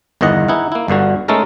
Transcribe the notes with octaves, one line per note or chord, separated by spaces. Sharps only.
G1 E2 D#3 E3 D#5 F#5
D#4 E4 G#4 F#5
A#3 E4
G1 G2 D3 F#4
G#3 A3 C#4 D#4 A4 A#4